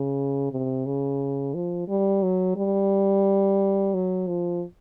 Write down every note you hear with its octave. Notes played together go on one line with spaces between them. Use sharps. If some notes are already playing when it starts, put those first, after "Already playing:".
Already playing: C#3
C3
C#3
F3
G3
F#3
G3
F#3
F3